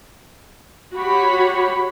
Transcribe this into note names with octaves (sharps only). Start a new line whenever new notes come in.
F#4 G4 C#5 B5